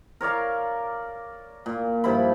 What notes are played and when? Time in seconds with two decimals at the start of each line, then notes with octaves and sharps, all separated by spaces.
0.21 A#4 C#5 D5 F5
1.66 A#2
2.04 G2 F3 E4 B5